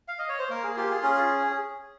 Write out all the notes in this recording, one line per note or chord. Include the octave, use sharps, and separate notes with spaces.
F5
D#5
C#5
C5
A#3 A#4
G#4
F4 G4
G#4
C#4 G#4